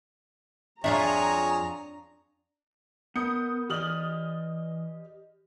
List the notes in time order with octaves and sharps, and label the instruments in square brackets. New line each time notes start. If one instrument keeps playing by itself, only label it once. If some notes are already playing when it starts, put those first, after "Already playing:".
[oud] F2 F4 E5 [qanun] D4 [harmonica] G#4 C#5 [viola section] A#5
[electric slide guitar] B3 [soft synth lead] A#4 [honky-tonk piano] D#6 G6 C#7
[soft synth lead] E3 [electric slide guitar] G4 D5 D#5 [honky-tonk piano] D#6 F6 F#7